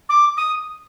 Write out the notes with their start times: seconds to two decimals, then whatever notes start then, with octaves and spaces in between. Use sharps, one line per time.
0.09 D6
0.37 D#6